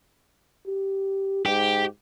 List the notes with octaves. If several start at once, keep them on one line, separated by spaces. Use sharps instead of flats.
G4
G#2 G4